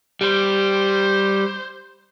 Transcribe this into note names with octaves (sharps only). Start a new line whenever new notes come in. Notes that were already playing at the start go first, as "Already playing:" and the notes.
G3 C5